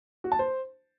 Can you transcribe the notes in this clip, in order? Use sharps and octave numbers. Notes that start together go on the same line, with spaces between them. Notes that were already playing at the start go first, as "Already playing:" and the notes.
F#4
A5
C5